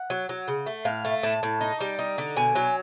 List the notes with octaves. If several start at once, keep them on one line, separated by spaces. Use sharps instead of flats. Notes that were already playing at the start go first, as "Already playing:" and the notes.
Already playing: F#5
F#3
F#3
C#3
A3
A2 F5
A3
A2 A5
A2
D#4
G3
D#4
D3
B2 G#5
F#3